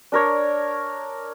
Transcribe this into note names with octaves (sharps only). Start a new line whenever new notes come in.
D4 A#4 C#5